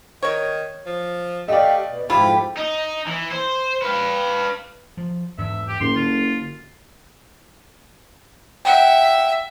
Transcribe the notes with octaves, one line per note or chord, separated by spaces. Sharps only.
D#3 A#4 C#5
F3
A3 G4 D5 D#5 F5
B2
F2 G#2 E4 F4 G4 B5
D#4
E3
C5
B4 F5
F3
E2 G#2 D3 E5
G4
F#1 A2 C6
D3 F4
E5 F#5 G5